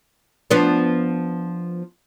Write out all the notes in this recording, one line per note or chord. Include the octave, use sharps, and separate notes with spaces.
F3 B3 D4